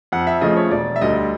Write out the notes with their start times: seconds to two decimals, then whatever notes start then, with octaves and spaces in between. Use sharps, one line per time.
0.12 F2 F#5
0.27 E5
0.41 C#3 F3 A3 D#5
0.56 C#5
0.71 E1 D5
0.96 E5
1.01 D2 D3 G3 D#5